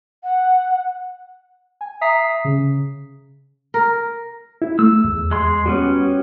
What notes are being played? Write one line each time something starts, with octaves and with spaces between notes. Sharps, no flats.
F#5
G#5
E5 A#5 D#6 B6 C7
C#3
A#4
E4
A3 E6
E2
G#3 C6
G3 B3 C#4 F#4